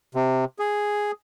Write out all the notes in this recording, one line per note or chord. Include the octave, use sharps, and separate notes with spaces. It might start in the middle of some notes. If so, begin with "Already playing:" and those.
C3
G#4